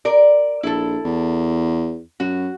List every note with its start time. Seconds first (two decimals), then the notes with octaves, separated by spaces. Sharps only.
0.05 A#4 D5
0.63 A#1 E4 A4
1.04 E2
2.20 F#2 F#4